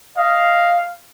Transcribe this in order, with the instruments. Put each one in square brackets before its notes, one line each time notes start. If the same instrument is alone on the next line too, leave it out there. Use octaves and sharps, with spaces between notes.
[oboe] D#5 [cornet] F5